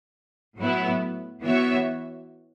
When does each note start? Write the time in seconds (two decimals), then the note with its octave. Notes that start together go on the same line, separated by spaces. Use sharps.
0.59 A2 F#3 B3 E4
1.43 E3 B3 F#4 C#5 E5